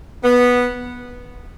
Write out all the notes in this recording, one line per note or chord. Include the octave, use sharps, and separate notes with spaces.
B3